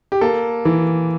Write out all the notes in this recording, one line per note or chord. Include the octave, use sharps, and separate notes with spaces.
G4
A#3 A4
E3